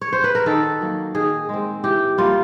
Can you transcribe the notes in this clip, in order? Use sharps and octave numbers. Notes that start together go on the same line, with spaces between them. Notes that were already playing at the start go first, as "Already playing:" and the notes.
C#5
C5
B4
A#4
D#3 A4
F#3 A#3
D#3 G#4
G#3 C4
E3 G4
G3 A#3 F4